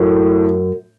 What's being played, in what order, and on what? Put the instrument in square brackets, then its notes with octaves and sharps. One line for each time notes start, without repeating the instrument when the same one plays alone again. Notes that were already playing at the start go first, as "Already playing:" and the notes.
Already playing: [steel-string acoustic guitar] F#2 [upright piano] A2